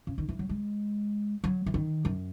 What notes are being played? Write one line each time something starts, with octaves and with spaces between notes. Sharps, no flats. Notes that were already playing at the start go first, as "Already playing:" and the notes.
C#3
D#3
E3
F#3
G#3
F#3
E3
D#3
F#2